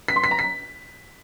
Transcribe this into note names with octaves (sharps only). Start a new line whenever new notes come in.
B6
C6
B6
A#5
B6